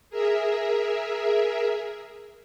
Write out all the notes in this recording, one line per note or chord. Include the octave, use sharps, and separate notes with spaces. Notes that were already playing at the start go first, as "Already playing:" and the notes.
G#4 A#4 E5